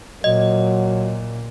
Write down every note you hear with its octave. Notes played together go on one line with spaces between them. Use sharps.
A#2 F#3 D#5